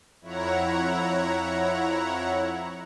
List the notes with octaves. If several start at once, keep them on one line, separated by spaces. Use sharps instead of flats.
F2 E4 C#5 F#5 A#5